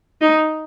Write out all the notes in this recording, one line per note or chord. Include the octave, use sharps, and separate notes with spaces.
D#4